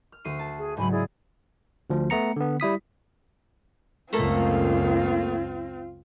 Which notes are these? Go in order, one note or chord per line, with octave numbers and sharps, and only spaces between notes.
F6
D2 C7 D#7
A5
G#4
G#2 C#3 F#3 G#5 B5
E4 G#4 D5
D2 F3
A3 B3 A#5 C#7
D3 B3
G3 E4 D#6 B6
C#2 F#2 A3 A#3 C4 F4 A4